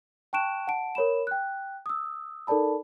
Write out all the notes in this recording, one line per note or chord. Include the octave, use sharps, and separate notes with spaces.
G5 A5 C#6 F#6 D7 E7
F#5 A5 D7
A#4 C#5 B5 E7
G5 F#6
D#6 E6
D#4 A4 A#4 D5 A5 B5